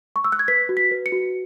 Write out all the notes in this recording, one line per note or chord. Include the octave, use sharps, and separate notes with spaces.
C#6
E6
F#6
G#6
B4 B6
F#4
B6
B4
C#7
F#4